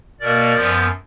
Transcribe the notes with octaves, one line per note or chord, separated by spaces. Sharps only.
B2 A#3 A#4 D5
F#2 F3 B3